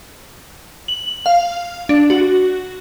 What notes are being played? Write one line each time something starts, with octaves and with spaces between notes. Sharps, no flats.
F#7
F5
D4
F#4